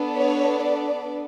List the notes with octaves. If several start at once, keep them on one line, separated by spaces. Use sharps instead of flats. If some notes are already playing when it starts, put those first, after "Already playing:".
Already playing: B3 D4 A4
C#5
D5